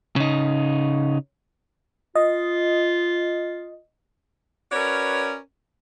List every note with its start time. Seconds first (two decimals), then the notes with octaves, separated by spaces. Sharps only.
0.16 C#3 D#4
2.15 F4 D#5
4.72 C#4 F#4 A#4 B4 C#5 D5